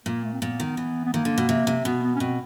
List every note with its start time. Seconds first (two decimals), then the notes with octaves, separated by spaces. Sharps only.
0.06 A#2 A#3
0.24 A3
0.33 C4
0.42 A#2 B3
0.60 D#3
0.77 E3
1.05 B3
1.13 D#3 A#3
1.25 D3
1.38 B2
1.49 C3
1.67 C3
1.85 B2 B3
2.03 B3
2.16 C#4
2.20 B2 C4